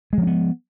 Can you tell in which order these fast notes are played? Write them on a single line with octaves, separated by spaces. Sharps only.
G#3 F3 C#4 B3